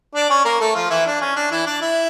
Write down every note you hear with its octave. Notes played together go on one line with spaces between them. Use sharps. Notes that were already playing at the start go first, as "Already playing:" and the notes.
D4 D5
C#4 C#5
A#3 A#4
A3 A4
F3 F4
E3 E4
D4
C#4
D4
E3 E4
D4 D5
E4 E5